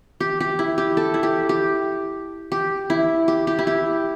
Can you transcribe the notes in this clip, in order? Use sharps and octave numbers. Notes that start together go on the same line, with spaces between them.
G4
G4
E4
G4
A4
E4
G4
G4
G4
E4
G4
G4
E4
G4